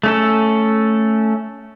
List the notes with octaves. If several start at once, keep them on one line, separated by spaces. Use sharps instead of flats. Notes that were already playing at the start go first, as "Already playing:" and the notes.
A3 C#4 A4